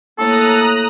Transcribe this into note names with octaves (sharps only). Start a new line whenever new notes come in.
A2 A#3 A4 A#5 D6 D#6 F#6